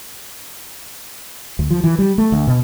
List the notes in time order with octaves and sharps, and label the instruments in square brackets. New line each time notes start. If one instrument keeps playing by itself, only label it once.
[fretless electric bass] D2
F3
E3
G3
A3
D2
B2